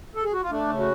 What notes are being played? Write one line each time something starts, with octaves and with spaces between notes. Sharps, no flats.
A4
G#4
F#4
F4
A3 D4
C#3
F#4